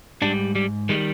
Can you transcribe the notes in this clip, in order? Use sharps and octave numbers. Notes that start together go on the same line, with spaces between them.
G#2 G3 D4
G3
D#3 G3 G#3